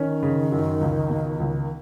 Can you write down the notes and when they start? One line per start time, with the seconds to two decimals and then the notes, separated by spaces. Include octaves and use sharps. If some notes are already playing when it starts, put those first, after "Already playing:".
Already playing: D#3 C#4
0.23 C#3
0.52 F#2
0.81 C#2
1.09 B2
1.40 C#2